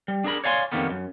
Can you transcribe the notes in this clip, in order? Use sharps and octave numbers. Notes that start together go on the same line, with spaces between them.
G3
D4 G#4 A#4 B5
C#5 D5 F5 G#5 A#5 C6
F2 B2 D#3 G3 A#3 B3
F#2